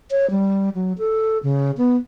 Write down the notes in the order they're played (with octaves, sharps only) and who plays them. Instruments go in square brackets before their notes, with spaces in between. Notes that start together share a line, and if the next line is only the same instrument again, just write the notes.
[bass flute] C#5
G3
F#3
A4
C#3
B3